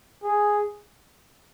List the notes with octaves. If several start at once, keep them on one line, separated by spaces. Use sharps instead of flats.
G#4